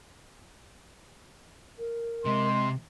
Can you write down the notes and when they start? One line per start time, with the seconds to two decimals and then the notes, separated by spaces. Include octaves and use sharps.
1.79 A#4
2.25 C3 G#3 C6